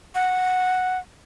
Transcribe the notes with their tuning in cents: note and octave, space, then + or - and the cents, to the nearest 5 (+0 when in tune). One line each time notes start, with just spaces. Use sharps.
F#5 -5